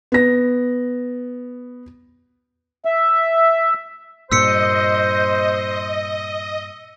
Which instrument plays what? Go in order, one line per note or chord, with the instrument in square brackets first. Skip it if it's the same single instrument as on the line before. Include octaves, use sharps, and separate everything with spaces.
[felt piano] B3 A#6
[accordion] E5
[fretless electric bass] G2 A#2 A#3 [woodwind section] C5 [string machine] D#5 [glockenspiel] E6 B6 C#7